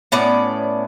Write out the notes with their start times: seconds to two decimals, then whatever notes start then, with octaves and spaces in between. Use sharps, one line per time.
0.12 A2 B3 C#4 D5